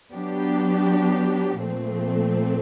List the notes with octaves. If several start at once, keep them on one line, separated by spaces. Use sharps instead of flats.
F#3 B3 D4 G4
A#2 F3 A3 C4